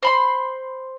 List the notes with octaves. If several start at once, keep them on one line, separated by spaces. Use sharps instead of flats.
C5 B5 C6